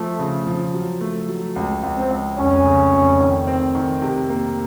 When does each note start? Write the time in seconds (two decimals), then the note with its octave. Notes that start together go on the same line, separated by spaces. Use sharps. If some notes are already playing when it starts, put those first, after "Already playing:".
Already playing: F3 A3
0.19 C#3
0.47 F3
0.74 F#3
1.01 A3
1.28 F#3
1.56 C#2
1.83 C#2
1.97 C4
2.10 C#2
2.37 F1 C#4
2.65 C#3
2.93 F1
3.20 D#3
3.47 C4
3.75 D#3
4.02 C3
4.29 A#3